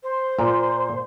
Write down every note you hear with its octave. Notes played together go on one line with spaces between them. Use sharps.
C5
A#2